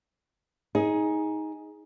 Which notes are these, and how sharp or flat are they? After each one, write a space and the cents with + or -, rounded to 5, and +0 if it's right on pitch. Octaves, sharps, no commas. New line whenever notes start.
D#4 +15 G#4 +0